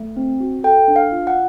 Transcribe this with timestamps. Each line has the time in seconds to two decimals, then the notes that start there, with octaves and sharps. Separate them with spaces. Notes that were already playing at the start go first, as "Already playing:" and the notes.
Already playing: A3
0.17 C4
0.40 F#4
0.64 A4 G5
0.88 D4
0.96 F5
1.12 F4
1.27 F#5